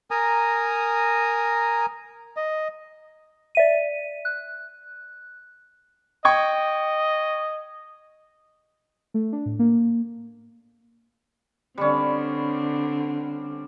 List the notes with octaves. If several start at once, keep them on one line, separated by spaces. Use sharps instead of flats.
A#4 G#5 A#5 D#6
D#5
D5 E5 D#7
F#6
D#5 G5 C#6 G#6
A3
D4
A2
A#3
D3 G3 C4 C#4